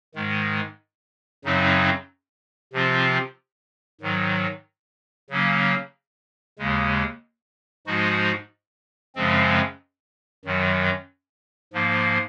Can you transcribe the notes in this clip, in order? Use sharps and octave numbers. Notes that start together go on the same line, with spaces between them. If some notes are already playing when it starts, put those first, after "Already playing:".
G#2 D#3 G#3
F#2 C#3 F#3 C4 D#4
C3 F3 C4 F4
G#2 D#3 F#3
C#3 F#3 A#3 C#4
D#2 C#3 G#3
G#2 F3 G#3 D#4 F#4
F#2 C#3 F3 G#3 C4
F#2 D#3 F#3
G#2 F3 A#3